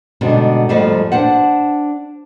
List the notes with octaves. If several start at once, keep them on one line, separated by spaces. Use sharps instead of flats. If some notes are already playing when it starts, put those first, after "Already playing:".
G#2 B2 D3 G3
F2 G#2 F3 G3 A3
D4 C5 F#5